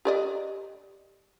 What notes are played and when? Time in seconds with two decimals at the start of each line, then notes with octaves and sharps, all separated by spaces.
0.05 G4 D5 D#5